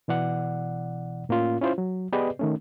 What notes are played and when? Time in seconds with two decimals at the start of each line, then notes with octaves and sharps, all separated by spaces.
0.08 B2 E3 D5 F#5
1.29 A2 A#3 C#4 F4
1.61 C#4 E4 F4 C5
1.78 F#3
2.12 B3 G4 G#4 B4 D5 D#5
2.39 D#3 A3 C#4